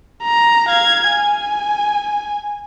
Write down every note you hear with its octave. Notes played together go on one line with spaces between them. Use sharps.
A#5
F5 G#6
G#5